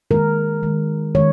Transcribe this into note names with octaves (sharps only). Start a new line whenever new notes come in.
D#3 G#3 A#4
D#3 G#3
D#3 G#3 C#5